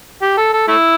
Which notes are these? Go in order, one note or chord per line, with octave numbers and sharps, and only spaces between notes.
G4
A4
A4
A3 E4